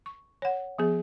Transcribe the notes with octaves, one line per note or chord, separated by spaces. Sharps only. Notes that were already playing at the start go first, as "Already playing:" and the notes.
C#6
C#5 F#5
F3 B3 G#4